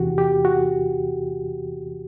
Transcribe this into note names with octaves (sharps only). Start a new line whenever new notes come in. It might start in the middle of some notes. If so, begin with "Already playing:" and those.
Already playing: E2 C3 E3 F#4 G4
G4
F#4